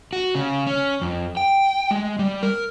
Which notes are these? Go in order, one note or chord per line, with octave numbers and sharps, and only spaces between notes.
F#4
C#3
C#4
F2
G5
G#3
G3
A#4